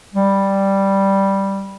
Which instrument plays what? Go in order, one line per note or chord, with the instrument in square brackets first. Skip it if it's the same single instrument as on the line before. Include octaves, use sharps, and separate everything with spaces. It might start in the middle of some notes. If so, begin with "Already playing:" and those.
[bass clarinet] G3